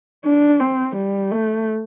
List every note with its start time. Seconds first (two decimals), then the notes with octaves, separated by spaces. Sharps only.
0.25 D4
0.60 C4
0.96 G3
1.32 A3